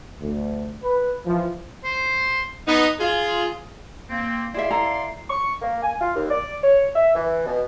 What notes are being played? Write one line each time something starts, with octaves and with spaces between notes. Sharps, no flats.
D2
B4
E3 F3
C5
B3 D#4
F4 G#4
A#3 C4
E4 G#4 D5 E5 F5 C6
E4 A4 A#5
C#6
A#3
G#5
F4
D#2
D5
C#5
E5
E3
B2